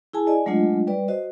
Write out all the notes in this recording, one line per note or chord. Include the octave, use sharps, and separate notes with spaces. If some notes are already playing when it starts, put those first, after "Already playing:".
E4 G#4 G#5 A5
D5 D#5 G#5
F#3 G#3 A3 D4 F4 D#5
G3 B4 D5
F#4 C5 D#5